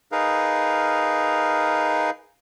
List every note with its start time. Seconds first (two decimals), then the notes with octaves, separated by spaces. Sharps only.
0.12 D#4 G#4 A#4 B4 F5